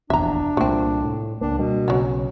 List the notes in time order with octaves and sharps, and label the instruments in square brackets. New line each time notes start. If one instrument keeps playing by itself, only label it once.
[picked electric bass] F1 A#1 E2 [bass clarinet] D4 [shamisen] E5 A#5
[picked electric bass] C2 A#2 [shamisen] A3 C4
[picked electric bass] A2
[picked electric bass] C#2 A#3 [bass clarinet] D4
[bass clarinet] B2 [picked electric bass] G3 A#3 D4
[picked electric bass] B1 C#3 [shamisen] F#3 B3